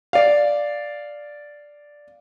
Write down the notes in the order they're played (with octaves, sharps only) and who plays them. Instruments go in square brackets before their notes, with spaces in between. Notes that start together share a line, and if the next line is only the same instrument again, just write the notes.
[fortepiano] D5 F5